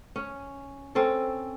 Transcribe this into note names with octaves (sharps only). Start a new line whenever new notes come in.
C#4
C4 C#4 A4